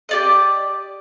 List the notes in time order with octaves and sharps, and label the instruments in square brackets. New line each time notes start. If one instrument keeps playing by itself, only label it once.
[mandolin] G4 D5 D#5